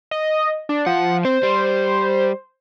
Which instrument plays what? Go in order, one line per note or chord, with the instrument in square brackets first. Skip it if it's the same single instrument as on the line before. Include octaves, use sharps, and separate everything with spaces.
[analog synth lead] D#5
D4
[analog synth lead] F3 [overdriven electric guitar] F#5
[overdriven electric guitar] C4 [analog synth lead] C5
[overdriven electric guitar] G3